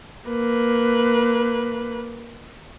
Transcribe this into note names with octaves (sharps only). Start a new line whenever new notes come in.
A#3 B4